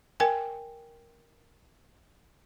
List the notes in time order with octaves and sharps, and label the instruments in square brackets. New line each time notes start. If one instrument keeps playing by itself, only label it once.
[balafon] A#4 G5 G#5